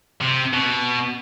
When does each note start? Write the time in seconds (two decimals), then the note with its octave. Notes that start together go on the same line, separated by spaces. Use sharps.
0.22 C3
0.54 B2